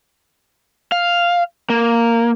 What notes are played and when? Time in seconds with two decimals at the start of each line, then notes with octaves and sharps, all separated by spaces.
0.92 F5
1.70 A#3